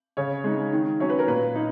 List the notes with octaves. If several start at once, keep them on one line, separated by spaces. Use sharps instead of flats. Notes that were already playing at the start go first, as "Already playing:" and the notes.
C#3 C#5
G#3 D#4
D#3
F#3 C#4 C#5
B4
A#4
A#2 B4
D#4